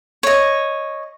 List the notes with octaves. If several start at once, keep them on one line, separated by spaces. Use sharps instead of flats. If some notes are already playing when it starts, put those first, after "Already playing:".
C#5 D#5